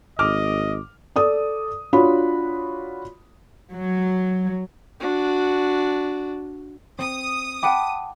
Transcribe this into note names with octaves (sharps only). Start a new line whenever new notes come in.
G#1 D#5 D6 F6
A4 D5 D#6
D4 F4 F#4 C#5 B5
F#3
D4 F#4
C4 D#6
F#5 G5 A5 B5 D6